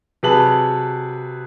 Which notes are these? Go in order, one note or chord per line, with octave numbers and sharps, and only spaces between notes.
C3 F#3 G#4 B4 A5 F#7